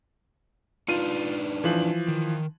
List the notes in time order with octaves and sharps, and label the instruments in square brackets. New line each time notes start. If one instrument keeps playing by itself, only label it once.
[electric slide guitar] D4 D#4 B4 [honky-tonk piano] F4 D#7
[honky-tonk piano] E3 F3 F#7
[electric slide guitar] D#3